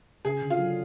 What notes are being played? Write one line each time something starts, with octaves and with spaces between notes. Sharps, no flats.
C#3 G#4
D3
F4
F#3